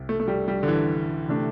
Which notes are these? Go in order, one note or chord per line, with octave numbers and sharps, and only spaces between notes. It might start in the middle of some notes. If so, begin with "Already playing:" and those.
Already playing: C2 C3
A3
A3
G3
G3
D3
E3
C3 A3 D4 A4